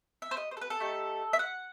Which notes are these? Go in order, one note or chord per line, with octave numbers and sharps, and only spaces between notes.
E5
C5
D#5
C5
A4
B4
A4
A3 D#4 G4
E5
F#5